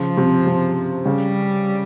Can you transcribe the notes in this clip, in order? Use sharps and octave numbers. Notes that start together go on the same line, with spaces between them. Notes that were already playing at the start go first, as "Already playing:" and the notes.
Already playing: C#3 F3
C3
C3
C#3 G3